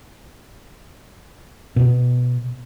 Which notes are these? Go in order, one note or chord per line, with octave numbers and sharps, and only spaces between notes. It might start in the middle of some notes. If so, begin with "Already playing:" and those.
B2